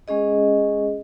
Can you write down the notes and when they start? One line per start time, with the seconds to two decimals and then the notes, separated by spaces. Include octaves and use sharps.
0.08 G#3 C#4 G#4 D#5